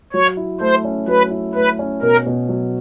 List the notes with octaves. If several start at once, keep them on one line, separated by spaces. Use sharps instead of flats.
F#3 C#5
E4
A3 C5
C#4
F#3 B4
E4
A3 B4
C#4
B2 A#4
B2
F#3